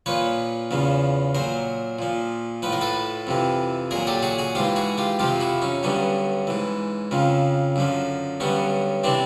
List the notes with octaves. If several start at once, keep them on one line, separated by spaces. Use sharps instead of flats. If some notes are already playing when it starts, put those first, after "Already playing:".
A#2 F3 B4 C#5
E2 C#3 F3
A#2 F#3 A#4 C5
A#2 F3
A2 F3 B4
A#4
A4 B4
F2 C3 E3
A#2 F#3 G#4 A#4
G4 A4
F#4 G#4
F#4 G#4
G#2 E3 F4 G4
F#4 G#4
F4 G4
F2 C3 F3 F4 G4
E4 F#4
C#4 D#4
G2 D3 F#3 B3 C#4
G#2 E3
F2 C#3 F3
F#2 D3 F3
G2 D3 F#3 B3 C#4
C3 E3 C4 D4